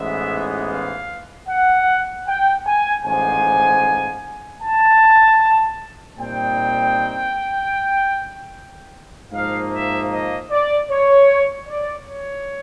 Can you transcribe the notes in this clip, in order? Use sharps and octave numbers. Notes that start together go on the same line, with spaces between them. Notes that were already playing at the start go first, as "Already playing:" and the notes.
Already playing: A1 G#2 E3 G#3 B3 E5
F5
F#5
G5
G#5
A1 G#2 F3 G#5
A5
A#2 G3 C4 D#4 G5
G#2 F3 A#3 D#4 F5
E5
D#5
D5
C#5
D5
C#5